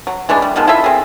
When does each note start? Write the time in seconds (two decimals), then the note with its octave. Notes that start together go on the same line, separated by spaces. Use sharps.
0.07 F#3
0.29 E3 G#3 A3 D4
0.42 G3
0.56 B2 D#3 F3 G#3
0.68 E4 F4 A4 E5
0.84 C4 G#4